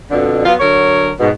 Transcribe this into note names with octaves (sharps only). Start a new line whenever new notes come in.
F2 B2 D3
F#3 B3 F4
D3 F#3 A#4 C#5
G#2 B2